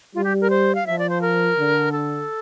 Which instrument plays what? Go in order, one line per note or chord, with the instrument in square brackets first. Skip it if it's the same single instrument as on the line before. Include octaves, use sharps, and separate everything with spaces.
[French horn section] G3 [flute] F4
[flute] G4
A#4
C5
F5
[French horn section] F3 [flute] E5
[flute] D5
C5
A#4
[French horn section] D3
[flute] A4